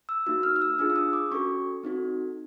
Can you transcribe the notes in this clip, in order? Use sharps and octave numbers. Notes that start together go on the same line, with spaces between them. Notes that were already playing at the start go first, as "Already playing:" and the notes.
E6
A#3 D#4 F#4 E6
F6
F6
E6
D4 F4 G#4 E6
E6
D#6
D6
C#4 F#4 A4 C#6
C4 D#4 F#4 A4